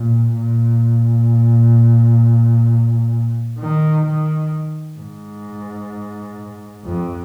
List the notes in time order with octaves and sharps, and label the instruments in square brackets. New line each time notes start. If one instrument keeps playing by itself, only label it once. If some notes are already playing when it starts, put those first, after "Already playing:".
Already playing: [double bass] A#2
A#2
D#3
D#3
G#2
F2